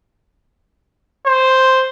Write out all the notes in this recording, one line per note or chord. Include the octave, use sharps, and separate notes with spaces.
C5